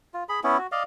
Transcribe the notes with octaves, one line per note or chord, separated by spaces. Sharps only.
F4
G#4 B5
B3 C#4 E4
F#4
D5 D#5 F5